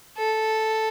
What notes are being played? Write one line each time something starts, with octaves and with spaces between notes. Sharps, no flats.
A4